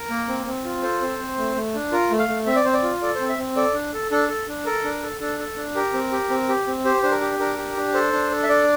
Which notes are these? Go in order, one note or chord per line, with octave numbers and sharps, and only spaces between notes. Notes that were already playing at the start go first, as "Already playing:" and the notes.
Already playing: A#4
A#3
C4
C4
F4
A4 C5
C4
C4
A3
A3
D4
F4 A#4
A3
F5
A3
C4 E5
D5
C4 C5
D5
F4
A4 D5
C5
C4
E5
C4
A4 D5
D4
A4
D4 A4
A4
D4
A4 A#4
D4
A4
D4 A4
A4
D4
G4 A#4
C4
G4
C4
G4
C4
G4 C5
D4 C5
A#4
G4
D4 A#4
G4
D4
A4 C5
D4
A4
E5
D4 D5